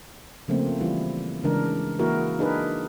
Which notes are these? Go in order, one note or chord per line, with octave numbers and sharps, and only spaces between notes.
C#3 F3 A3 A#3 C4
E3 G3 E4 F4
C#3 E3 G#3 D4 A#4
E3 A#3 E4 F#4 G#4 A#4
D4 D#4 G#4 A#4 B4